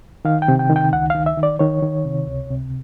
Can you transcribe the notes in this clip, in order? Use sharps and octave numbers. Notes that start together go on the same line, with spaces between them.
D#3 F5
G5
C3
G5
D#3
G5
C#2 F#5
D#3 F5
E5
D#3
D5
D#3 C#5
D#3
C3
C#2
C3